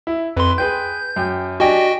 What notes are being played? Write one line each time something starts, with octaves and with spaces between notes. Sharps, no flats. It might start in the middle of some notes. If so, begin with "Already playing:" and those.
E4
F2 B4 C6
G#4 B4 G5 G6
F#2 G5
D4 F#4 G4 D#5 G5 G#5